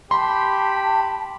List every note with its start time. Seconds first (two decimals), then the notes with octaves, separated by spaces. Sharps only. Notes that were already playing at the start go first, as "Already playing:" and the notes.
0.11 G4 A5 B5 C6